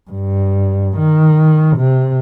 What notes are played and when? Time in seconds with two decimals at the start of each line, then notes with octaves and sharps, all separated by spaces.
0.10 G2
0.98 D#3
1.77 C3